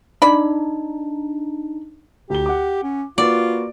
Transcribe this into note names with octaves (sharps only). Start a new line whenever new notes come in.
D4 D#4 D5 B5
D2 G4 G7
F#5 D6
C#4
A#3 F4 F#4 B4 D5